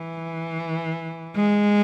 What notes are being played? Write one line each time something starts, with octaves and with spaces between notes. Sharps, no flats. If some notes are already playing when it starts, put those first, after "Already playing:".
Already playing: E3
G#3